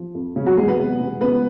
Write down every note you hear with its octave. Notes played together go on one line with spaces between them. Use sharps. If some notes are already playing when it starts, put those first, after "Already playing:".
Already playing: F3
F2
E1 C#3 C#4
F#3 F#4
E2 G#3 G#4
B3 B4
C3
E1
C#2 B3 B4